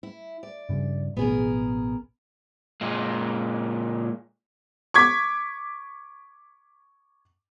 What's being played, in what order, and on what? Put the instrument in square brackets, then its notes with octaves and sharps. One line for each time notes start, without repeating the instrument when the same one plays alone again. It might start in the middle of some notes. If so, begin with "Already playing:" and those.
[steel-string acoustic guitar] E4
D5
[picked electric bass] G2 C#3
[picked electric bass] A1 B2 [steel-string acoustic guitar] B3 G#4 A#4
[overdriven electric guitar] A#2 G#3
[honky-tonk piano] C#6 D6 G#6 B6